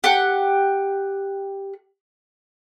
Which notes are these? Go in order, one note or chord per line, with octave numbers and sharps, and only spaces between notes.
G4 F#5